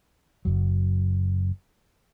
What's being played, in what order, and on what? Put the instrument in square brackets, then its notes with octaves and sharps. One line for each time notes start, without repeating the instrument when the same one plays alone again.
[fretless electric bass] F#1 F#2 F#3